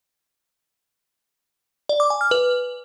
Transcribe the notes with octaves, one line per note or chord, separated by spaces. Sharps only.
D5
D6
G#5
F6
B4